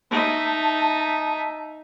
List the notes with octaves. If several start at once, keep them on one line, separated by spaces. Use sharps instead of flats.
D#4 E5 A5